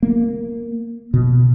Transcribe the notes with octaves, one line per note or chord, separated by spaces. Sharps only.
A#3
B2